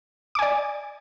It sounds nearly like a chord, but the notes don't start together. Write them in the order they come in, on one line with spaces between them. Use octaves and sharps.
D6 G#5 D5